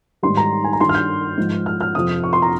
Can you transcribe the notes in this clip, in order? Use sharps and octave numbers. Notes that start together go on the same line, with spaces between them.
G#2 D#3 G3 C6
A#5
G#5
A#5
G2 D#3 G3 C6
F6
G6
G#2 F3
F6
F6
F2 C3 F3 D#6
C#6
C6
A#5